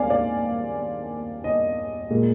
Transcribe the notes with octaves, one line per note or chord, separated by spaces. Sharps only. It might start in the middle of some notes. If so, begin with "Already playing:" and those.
Already playing: D#2 G#3 C4 D5 F5 G#5
D5
D#5
A#2 G#3